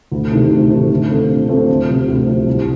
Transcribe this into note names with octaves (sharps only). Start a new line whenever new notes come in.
D2
C3 D#3 A3
D2
C3 D#3 A3
D3
A3 C4 F4 A4
D3
A3 C4 F4 A4
D2
C3 F3 C4
D2
C3 F3 C4
C2